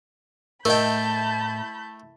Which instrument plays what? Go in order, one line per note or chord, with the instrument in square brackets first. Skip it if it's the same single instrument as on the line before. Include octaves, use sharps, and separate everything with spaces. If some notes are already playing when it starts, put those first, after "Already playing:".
[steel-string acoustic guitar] A2 [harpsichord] A3 G5 [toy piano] A#4 D#5 [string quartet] A5 B5 G6